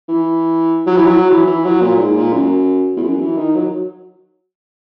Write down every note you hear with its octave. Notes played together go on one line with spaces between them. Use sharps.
E3
F#3
E3
F#3
E3
E3
F#3
A#2
G#2
A#2
F#2
E2
F#2
E3
D#3
F#3